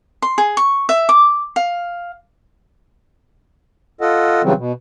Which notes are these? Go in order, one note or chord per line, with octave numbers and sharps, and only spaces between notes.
C6
G#4
C#6
E5
D6
F5
F4 A4 D#5 F#5
C#3 E3 F#3 G3 C4
B2